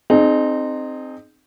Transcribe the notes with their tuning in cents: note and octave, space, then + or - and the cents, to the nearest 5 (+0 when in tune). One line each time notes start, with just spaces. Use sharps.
C4 +0 D#4 -25 G#4 +20